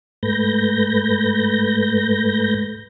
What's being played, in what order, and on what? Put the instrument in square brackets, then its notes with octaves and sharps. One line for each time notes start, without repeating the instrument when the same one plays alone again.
[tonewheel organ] G#2 A3 B4 G6 A#6